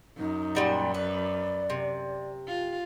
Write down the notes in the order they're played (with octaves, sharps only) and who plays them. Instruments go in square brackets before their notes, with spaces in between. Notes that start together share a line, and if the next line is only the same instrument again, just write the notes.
[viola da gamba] F#2 [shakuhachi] D#4
[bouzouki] A#2 G3 F#5
[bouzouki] B4 [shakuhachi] D5
[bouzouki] C3
[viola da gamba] F4